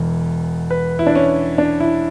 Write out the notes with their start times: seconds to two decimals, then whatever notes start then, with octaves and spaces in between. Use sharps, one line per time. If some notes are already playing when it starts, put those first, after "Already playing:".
Already playing: E1 E2
0.71 B4
0.99 E4
1.07 D4
1.15 C#4
1.58 D4
1.80 E4